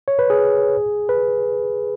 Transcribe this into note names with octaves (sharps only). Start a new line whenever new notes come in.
C#5
B4
G#4
B4